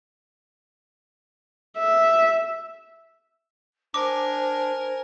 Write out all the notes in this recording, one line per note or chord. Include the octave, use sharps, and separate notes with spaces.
E5
D4 A#4 C5 G#5 D6